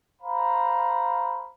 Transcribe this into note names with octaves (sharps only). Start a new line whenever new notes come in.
C5 F5 A#5 B5